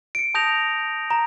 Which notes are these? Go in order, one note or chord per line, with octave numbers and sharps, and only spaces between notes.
C#7 D7
A5 D#6 G6 A#6 F7
A#5